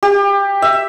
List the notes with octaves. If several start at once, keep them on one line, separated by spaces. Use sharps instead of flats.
G4
E5